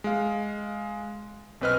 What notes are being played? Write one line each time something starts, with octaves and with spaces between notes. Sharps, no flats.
G#3 F5
B1 C4 B4 D#5 F6